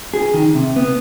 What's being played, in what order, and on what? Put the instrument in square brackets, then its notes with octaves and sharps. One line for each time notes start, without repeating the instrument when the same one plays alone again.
[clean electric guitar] G#4
D#3
C3
B3